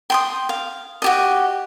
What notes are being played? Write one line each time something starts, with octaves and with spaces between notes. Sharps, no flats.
G5 C6 D#6
F5
F#4 G4 D#5